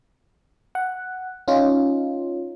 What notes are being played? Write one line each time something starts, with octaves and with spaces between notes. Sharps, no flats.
F#5
C#4 D#4 F4